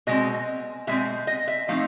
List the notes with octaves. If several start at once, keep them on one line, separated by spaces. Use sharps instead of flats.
B2 G#3 C4 D#5
B2 G#3 C4 E5
D#5
E5
F3 A3 C4 D#4 F5